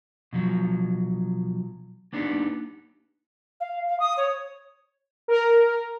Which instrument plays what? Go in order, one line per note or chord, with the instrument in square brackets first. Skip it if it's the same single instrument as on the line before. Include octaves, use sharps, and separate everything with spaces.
[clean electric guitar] B2 F3 F#3
A#3 B3 D4 D#4 G4
[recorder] F5
F5
D#6
C#5
[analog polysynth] A#4